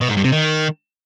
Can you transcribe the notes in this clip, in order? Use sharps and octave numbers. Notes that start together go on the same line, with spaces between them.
B2
G#2
G2
C3
D#3